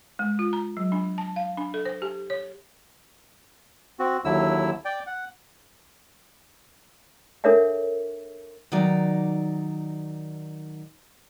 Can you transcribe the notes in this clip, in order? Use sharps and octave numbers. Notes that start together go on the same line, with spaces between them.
G#3
F4
A#5
F#3
D4
A5
F5
D4
A4
C5
G4
C#5
C4 F#4
D#2 D3 F#3 E4 E6
D5 G5
F#5
D4 A4 A#4 C#5 E5 F#5
D#3 F#3 D#4 D5